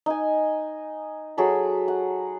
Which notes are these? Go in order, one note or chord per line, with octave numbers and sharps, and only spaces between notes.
D#4 G#5
F#3 G#4 A4 B5
F#5